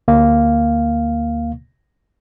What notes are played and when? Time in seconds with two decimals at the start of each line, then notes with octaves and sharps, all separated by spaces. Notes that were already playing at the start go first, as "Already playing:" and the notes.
0.08 D2 A#3 F5